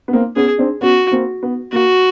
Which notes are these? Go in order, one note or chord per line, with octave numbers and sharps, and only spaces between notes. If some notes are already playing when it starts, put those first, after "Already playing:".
B3
A#3 C4
B3 C#4 G#4
C4 D4
B3 C#4 F#4
A#3 C4
B3
A#3 F#4